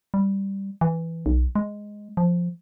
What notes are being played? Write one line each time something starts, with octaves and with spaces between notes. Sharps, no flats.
G3
E3
B1
G#3
F3